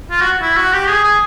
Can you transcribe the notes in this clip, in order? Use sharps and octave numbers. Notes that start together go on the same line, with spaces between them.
F4
F#4
E4
F#4
G4
G#4
G#4